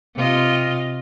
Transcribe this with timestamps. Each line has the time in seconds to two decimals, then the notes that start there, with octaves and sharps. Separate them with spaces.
0.15 C3 F4 D#5